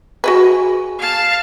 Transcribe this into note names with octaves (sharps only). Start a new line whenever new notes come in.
F#4 G#4 B4
F5 A5